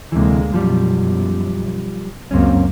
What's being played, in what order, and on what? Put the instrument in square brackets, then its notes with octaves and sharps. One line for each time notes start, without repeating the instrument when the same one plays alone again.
[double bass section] D2 G#3 A#3 [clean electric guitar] C3 E3
[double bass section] B1 F#2 [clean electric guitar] F3 G3
[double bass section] C#2 F#2 A#3 [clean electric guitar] C4 C#4